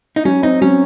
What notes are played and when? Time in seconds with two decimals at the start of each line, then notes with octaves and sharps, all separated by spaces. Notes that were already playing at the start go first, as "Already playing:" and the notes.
0.16 D#4
0.25 F#3 C#4
0.43 C4 D#4
0.61 F#3 C#4